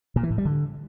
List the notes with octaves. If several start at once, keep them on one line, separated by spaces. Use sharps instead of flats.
A#2
E3
A2
G3
D3